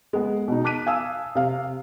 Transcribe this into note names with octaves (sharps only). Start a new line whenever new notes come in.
G#3 B3
B2 D#4
A5 D6 F#6 B6 D#7
F5 G#5 A5 D#6 E6
C3 F5